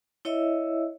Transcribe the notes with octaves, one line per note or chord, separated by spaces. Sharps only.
E4 C#5 D#5 E5 E6